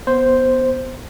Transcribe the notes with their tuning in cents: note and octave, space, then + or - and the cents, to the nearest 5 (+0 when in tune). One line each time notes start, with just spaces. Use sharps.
B3 +0 C5 +0